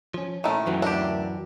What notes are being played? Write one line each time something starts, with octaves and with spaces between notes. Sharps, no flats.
F3 C#4
A#2 D#3 A3 C#4 E4
F#2 E3 F#3
D2 D4 G4 A#4 E5